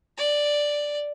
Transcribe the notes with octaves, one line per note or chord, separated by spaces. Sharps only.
D5